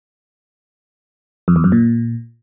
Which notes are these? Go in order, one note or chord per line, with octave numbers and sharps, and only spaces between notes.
F2
E2
F#2
A#2